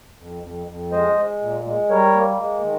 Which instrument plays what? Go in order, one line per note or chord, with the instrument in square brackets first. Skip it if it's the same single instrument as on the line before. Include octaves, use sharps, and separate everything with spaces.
[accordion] F2
F2
F2
G#3 C5 D#5
G#3
A#2
G#3
G3 A#4 C#5
A#3
G#3
D#3